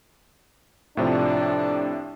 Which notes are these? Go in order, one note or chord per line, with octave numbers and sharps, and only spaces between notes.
A2 C3 F3 D4